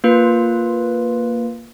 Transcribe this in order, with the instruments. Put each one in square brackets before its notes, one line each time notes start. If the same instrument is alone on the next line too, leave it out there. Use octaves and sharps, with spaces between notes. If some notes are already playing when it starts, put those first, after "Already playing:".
[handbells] A#3 F4 B4